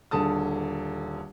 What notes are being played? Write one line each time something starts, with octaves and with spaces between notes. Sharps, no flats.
D#1 D3 G#4 A5 D#6